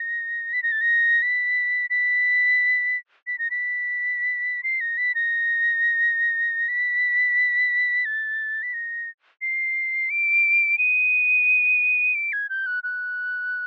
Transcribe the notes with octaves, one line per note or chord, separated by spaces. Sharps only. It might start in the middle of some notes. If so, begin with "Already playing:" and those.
Already playing: A#6
B6
A#6
A6
A#6
B6
B6
B6
A#6
B6
C7
A#6
B6
A#6
B6
A6
B6
A#6
C7
D7
D#7
D7
G#6
G6
F#6
F#6